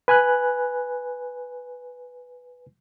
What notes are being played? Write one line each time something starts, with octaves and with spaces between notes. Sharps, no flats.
B4 G#5 B5 F#6